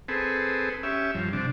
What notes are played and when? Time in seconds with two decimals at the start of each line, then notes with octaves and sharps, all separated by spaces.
0.08 C4 G#4 A4 B4
0.83 C#4 G4 E5
1.15 G2 F3
1.33 C3 D4